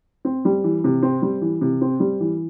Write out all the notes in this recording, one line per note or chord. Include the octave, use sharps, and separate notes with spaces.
C4
G3
E3
C3
C4
G3
E3
C3
C4
G3
E3